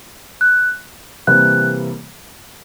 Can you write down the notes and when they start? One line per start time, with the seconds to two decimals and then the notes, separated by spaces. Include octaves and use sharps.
0.41 F#6
1.27 C3 E3 G3 A#3 F#6